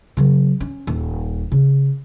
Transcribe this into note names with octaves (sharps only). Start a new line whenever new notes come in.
C#3 F#3
C#4
D#1
C#3